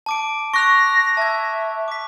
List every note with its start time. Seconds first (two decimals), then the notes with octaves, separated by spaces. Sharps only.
0.06 A5 D6 D7
0.54 C#6 F#6 A#6 F7
1.17 E5 A5 G#6
1.88 D6 B6